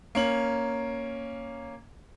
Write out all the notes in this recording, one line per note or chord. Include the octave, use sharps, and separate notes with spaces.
A#3 C#4 F#7